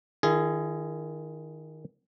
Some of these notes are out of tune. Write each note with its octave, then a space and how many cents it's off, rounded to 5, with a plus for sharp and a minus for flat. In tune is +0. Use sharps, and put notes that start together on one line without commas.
D#3 +0 F4 -45 G#4 +0